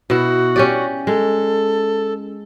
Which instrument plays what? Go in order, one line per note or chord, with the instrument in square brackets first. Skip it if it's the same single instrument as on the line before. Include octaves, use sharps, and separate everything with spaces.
[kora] B2 E4 [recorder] F#4
[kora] C#4 G4 D5
[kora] G#3 [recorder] A4